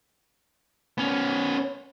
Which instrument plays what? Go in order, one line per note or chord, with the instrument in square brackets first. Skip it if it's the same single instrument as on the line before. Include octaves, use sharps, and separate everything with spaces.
[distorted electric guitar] B3 C#4